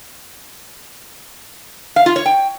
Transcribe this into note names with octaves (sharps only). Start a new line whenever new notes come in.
F5
F4
C#5
G5